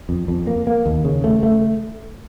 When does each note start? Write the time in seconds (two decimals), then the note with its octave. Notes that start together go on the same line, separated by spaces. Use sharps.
0.09 F2
0.28 F2
0.47 A#3
0.67 A#3
0.86 D#2
1.05 C#3
1.24 A3
1.43 A3